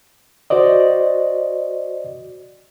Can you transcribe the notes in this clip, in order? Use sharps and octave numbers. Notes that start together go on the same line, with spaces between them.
F#4 C5 D5 D#5